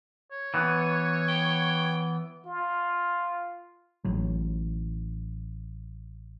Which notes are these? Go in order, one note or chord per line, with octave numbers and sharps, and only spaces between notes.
C#5
E3 B3
G5
F4
A1 A2 F#3